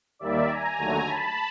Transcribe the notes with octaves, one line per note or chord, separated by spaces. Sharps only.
D#2 D#3 G3 A#3 D5 E5
G#5 A#5
D#2 D3 F#3 A3
A5 B5